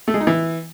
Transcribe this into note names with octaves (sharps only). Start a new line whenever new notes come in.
A3
G#3
D#4
E3